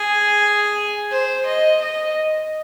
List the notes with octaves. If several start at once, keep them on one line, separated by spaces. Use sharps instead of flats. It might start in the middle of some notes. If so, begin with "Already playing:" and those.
Already playing: G#4
C5
D#5
D#5